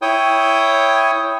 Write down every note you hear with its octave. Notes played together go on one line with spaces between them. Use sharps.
E4 C#5 G5 D#6